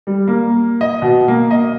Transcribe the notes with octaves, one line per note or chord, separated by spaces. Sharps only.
G3
A#3
D#5
B2
A#3
D#5